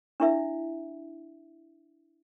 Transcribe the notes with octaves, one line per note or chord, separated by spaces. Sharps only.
D4 E4 E5